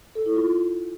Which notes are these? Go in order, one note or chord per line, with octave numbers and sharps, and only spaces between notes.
A4
E4
F4